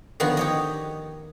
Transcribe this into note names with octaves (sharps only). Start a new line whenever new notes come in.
D3 D#3 F3 B3 F#4
G4 C#5 D#5